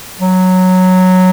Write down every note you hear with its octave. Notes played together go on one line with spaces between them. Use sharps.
F#3